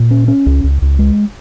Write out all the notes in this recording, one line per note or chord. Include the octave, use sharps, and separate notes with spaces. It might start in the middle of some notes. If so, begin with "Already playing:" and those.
Already playing: A#2
C#4
C#4
C#2
C#2
C#2
G#3